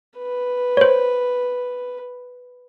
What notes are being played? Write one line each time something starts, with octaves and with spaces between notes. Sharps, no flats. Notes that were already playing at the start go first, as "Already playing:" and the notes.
B4
C5 C#5